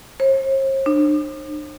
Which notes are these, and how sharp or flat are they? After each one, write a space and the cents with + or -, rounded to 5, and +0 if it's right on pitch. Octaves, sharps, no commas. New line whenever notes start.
C5 +45
D4 +40